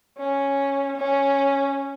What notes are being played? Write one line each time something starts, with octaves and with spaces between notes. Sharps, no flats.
C#4
C#4